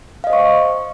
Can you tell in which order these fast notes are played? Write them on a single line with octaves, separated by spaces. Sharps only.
F5 D#5 C5 C#6